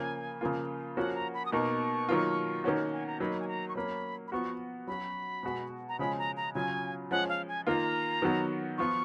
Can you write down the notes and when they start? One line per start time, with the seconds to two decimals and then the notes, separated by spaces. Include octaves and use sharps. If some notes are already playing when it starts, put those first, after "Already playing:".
Already playing: C#3 F3 A#3 C#4 G#5
0.41 C#3 F3 A#3 F4
0.97 F3 A#3 C#4 F#4 F#5
1.15 A#5
1.34 B5
1.46 D#6
1.52 B2 A#3 D#4 C#6
2.09 D#3 F#3 A#3 F4
2.64 D#3 A#3 C#4 F#4
2.93 G#5
3.07 A#5
3.20 F#3 A#3 D#4 B5
3.40 G#5
3.48 A#5
3.69 C#6
3.75 F#3 A#3 C#4 B5
4.28 B5
4.32 F3 B3 F#4 C#6
4.87 F#3 C#4 F#4 B5
5.43 B2 G#3 B3 F#4
5.89 A#5
5.99 C#3 F3 G#3 C#4 B5
6.18 A#5
6.37 A#5
6.54 C#3 F#3 C#4 F4 G#5
7.11 F3 G#3 C#4 F#5
7.29 F5
7.48 G#5
7.67 D#3 A#3 F4 A#5
8.22 D#3 F#3 B3 F#4
8.78 F3 B3 F4 C#6